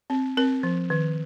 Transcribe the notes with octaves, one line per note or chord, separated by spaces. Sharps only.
C4
C4 A#4
F3
D#3